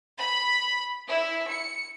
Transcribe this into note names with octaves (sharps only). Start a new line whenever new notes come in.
B5
E4
C#7